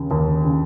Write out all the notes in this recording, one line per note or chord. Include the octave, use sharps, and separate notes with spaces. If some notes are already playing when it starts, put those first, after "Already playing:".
Already playing: D#2 C#3
D#2
C#3